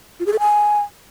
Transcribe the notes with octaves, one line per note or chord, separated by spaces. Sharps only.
F4
G#4
A4
G#5